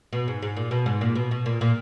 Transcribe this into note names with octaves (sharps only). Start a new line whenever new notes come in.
B2
G#2
G#2
A#2
B2
G#2
A#2
B2
B2
A#2
A#2